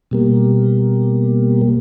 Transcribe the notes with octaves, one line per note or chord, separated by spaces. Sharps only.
B2 G3 A#3